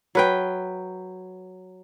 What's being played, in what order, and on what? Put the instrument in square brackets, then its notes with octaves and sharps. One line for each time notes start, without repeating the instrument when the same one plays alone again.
[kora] F#3 B4 G5